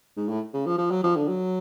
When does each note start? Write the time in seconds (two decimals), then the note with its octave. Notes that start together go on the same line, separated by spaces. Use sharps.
0.17 G#2
0.28 A2
0.53 C#3
0.66 F3
0.78 F3
0.91 F#3
1.04 F3
1.16 D3
1.28 F#3